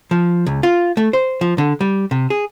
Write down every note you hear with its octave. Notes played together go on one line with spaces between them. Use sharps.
F3
C#2
F4
A3
C5
F3
D3
G3
C3
G#4